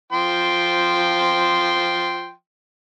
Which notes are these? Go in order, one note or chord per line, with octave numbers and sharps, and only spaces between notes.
F3 G5 C6